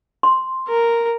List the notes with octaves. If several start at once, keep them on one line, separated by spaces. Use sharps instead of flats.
C6
A#4